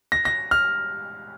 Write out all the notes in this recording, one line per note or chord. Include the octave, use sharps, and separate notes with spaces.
A#6
A#6
F6